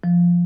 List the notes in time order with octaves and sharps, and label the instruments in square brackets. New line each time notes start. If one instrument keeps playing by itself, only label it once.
[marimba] F3